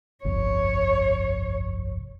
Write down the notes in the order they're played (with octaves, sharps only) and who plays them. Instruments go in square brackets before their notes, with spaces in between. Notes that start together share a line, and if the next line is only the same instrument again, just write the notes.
[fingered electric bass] G1 C2 F2 [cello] C#5